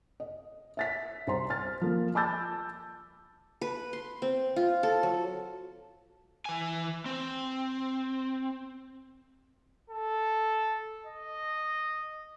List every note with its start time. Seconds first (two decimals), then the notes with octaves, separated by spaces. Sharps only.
0.20 D#5
0.77 E5 A6 B6
1.27 C2 C5 A#5 C6
1.50 F6 A6
1.81 F3 A#3
2.15 A5 B5 D6 E6 G6 A6
3.61 B4
3.93 C6
4.22 C4
4.56 F4
4.83 A4
5.03 F#3
6.45 E3 G#5
7.06 C4
9.89 A4
11.06 D#5